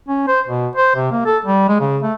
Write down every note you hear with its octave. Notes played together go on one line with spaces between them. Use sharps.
C#4
C5
B2
C5
C3
A#3
A4
G3
G#3
C#3
A3